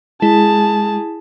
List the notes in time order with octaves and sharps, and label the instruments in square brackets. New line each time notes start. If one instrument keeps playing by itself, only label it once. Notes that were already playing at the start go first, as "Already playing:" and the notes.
[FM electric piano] G#3 [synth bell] E4 [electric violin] G#4 A5